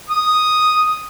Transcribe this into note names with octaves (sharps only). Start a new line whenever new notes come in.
D#6